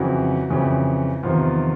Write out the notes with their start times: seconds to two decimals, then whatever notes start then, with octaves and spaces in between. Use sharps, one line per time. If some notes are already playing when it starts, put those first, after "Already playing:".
Already playing: F2 C#3 E3 F#3 F#4
0.50 F2 C#3 E3
1.23 E2 C3 D#3 F3 F4